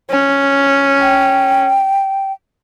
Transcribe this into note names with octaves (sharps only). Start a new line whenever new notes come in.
C#4
G5